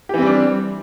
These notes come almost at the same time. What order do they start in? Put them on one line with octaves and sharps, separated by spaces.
G4 E3 C4 G3 D4